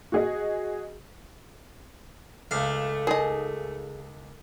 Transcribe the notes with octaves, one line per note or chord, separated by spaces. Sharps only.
F#4 G#4 D#5
C#2 A3 F5
D#4 G#4 A#4 D#5